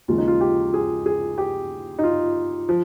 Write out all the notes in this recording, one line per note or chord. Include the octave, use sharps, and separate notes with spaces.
D#2 C#3 F3 G#3 F4
D#4
F4
G4
G#4
G#4
G4
D#4
F4
F3